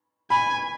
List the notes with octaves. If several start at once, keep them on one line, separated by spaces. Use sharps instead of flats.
G#5 B5